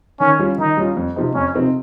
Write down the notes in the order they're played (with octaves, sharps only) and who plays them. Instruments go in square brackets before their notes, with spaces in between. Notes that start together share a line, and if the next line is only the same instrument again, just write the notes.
[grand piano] D#3 [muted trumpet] C#4
[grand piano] G3 C#4 F4
[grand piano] D#3 [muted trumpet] D#4
[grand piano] G3 C#4 F4
F2
C3 F3 C4 D#4
[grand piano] F2 [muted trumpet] C#4
[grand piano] C3 F3 C4 D#4